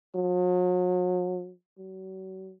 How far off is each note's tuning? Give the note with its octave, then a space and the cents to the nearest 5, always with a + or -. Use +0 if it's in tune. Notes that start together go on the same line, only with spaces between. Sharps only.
F#3 -40
F#3 +35